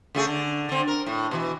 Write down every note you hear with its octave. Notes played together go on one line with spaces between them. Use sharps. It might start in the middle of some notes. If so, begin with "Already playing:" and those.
C#3 A3 G#4
D3
D3 C4
A#4
A2
B2 E3